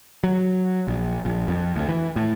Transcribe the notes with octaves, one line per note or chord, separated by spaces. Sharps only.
F#3
A#1
A#1
F2
D2
E3
A2